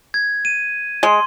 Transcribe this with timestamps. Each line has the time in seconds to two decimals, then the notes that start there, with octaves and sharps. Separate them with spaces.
0.14 G#6
0.45 D#7
1.03 G#3 C6